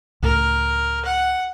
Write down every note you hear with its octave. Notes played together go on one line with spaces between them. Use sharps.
C#2 A2 A#4
F#5